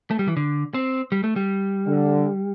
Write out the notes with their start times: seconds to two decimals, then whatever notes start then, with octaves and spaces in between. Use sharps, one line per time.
0.11 A3
0.19 G3
0.28 E3
0.37 D3
0.74 C4
1.12 G3
1.24 A3
1.36 G3
1.87 D3